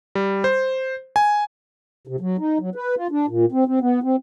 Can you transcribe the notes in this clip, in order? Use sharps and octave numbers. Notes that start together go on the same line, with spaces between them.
G3
C5
G#5
C3
F#3
D#4
F#3
B4
F4
D4
A#2
C4
C4
B3
C4